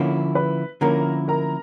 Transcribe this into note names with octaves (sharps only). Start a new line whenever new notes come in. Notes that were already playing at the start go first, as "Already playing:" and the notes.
Already playing: D3 F3 A#3 C#4 E4
B4 B5
D3 F3 A#3 C#4 E4 A#4 A#5
A#4 A#5